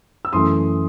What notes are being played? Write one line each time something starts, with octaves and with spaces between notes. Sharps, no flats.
E6
F#2 E3 A3 C6 D#6